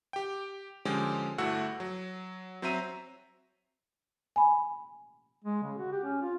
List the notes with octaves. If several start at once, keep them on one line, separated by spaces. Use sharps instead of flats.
G4 G5
D3 F3 G#3 C#4 G4
G1 A3 E4 F#4 F#5 E6
F#3
F#3 C4 C5 E5 A#5 D#7
G#5 B5
G#3
C#3
F#4
G4
C#4
F4